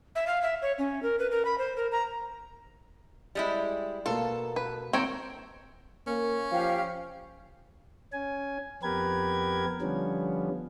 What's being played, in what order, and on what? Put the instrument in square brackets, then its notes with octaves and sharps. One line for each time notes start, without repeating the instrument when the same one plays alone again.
[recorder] E5
F5
E5
C#5
C#4
A#4
B4
A#4
B5
C5
A#4
A#5
[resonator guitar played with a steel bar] G3 G#3 E4
[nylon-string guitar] B2 A#3 [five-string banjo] F4 [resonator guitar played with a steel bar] A4
[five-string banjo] B4
[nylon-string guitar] D#3 A#3 [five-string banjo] C4 A#4 C#5 [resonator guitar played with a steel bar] G5
[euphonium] A#3 [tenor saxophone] C#4
[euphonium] F3 [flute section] G4 F5
[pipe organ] C#4 G#5
F2 B3 G4 A#4 B4 G#6
D3 F3 G3 B3 C#4